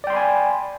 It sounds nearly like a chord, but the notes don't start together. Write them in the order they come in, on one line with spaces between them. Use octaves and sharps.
D5 G5 C6 B5 G#5